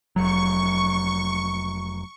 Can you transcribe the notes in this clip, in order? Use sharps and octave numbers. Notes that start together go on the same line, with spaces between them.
F1 F#3 C#6